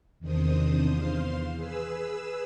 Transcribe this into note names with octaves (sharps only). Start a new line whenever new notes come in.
E2 C3 D#3 D4 C5 D#6
E2 C5 F5 C6
G#4 B4 E6